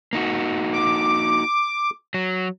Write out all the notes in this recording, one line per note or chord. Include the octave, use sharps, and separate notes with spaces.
A#3 D#4 F#4
D6
F#3